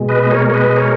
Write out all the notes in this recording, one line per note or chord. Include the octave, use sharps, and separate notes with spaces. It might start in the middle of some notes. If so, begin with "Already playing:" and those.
Already playing: B2 G#3
B4 D#5
D#5
A#4 C#5
C#5
B4 D#5
D#5
A#4 C#5